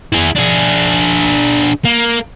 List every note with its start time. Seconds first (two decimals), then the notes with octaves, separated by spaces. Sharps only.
0.13 E4 G#4
0.36 D4 G#4
1.85 A#3